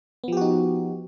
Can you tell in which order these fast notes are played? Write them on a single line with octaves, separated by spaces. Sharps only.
B3 F3 G4 F#4 D#4